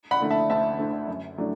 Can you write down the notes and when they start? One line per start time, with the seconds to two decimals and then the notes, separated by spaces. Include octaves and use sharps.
0.11 F#5 B5
0.21 D3 A3
0.30 E5 A5
0.50 D2 E5 A5
0.79 D3 A3
1.08 F#2
1.38 F#3 A3 D4